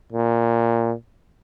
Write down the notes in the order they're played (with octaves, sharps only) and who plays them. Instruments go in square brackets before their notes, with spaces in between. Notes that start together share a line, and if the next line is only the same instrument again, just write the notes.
[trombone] A#2